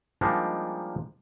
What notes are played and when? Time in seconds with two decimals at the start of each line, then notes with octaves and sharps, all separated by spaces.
0.21 F3 G3 G#3 A#3 D4 D#4